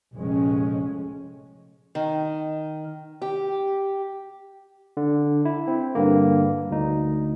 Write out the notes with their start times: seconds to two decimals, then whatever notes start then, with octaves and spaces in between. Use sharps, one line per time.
0.14 F1 A#1 F2 G#3 C#4
1.95 D#3
3.22 G4
4.97 D3
5.45 E4
5.68 C4
5.95 G2 D3 A#3
6.71 D2 D#4